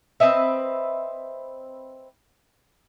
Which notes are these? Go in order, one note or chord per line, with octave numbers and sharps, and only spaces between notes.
C4 B4 D#5 E5